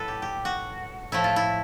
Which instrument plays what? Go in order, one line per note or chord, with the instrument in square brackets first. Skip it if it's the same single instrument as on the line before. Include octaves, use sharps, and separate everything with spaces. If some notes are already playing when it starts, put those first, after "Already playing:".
Already playing: [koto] A2 F#3 A4 B4
G4
G4
F#4
A2 F3 A3 E4
F4
E4